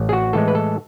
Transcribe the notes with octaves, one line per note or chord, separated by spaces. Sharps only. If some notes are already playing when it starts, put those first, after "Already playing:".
Already playing: A1
G#4
F#4
A2 E3 G#3 A4
B4
A4